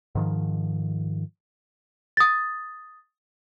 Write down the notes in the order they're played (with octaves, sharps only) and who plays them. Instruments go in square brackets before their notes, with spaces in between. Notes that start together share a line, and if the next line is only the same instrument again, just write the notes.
[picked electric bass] G#2 D#3 F3
[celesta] D#6 A6